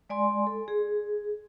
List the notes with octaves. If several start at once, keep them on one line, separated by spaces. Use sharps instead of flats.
G#3 D5 G#5 C6
A4
G#4